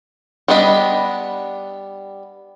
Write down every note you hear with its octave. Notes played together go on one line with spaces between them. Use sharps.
G3 B3 D4 D#5 B5